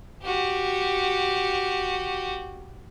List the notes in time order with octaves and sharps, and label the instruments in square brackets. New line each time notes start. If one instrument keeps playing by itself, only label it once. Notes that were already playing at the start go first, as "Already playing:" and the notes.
[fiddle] F#4 G4